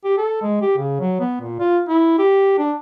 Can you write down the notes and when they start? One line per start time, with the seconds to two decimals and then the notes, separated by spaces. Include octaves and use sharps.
0.04 G4
0.18 A4
0.42 G#3
0.61 G4
0.77 C#3
1.00 F#3
1.20 B3
1.41 A#2
1.59 F4
1.88 E4
2.19 G4
2.58 D4